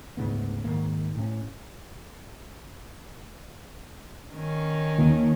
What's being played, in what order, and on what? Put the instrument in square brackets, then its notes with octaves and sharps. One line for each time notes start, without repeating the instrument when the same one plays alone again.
[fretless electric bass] D2 G#2 C#3 B3
G#2 D#3 A#3
A2 C#4
[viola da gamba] D#3 C#4
[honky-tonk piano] D#2